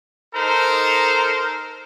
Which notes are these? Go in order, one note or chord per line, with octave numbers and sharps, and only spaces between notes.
D#4 A4 A#4 C5 A#5